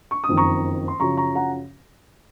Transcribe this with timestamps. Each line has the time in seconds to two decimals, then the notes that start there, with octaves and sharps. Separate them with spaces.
0.11 C#6
0.24 D#6
0.29 F#1 F2 D#3
0.37 A#5 C#6
0.88 C6
1.00 F#2 C#3 F3 A#5 C#6
1.17 A#5 C#6
1.35 F#5 A#5